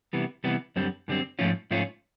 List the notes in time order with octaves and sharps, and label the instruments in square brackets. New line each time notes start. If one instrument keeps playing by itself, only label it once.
[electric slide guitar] C3 E3 G3 B3
C3 E3 G3 B3
F#2 D3 G3 C4
F#2 D3 G3 C4
G#2 F3 A3 C#4 F4
G#2 F3 A3 C#4 F4